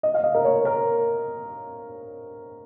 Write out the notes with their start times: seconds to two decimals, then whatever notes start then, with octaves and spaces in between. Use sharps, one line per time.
0.03 D#5
0.14 F5
0.24 D#5
0.35 A#4
0.44 C#5
0.65 A#4